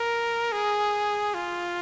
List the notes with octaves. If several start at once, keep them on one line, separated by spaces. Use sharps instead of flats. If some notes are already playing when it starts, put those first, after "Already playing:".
Already playing: A#4
G#4
F4